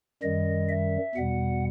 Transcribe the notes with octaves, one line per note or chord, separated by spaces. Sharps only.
F#2 D#3 G3 D#5
E5
E2 B2 G3 F#5